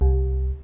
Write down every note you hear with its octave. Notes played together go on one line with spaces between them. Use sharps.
C2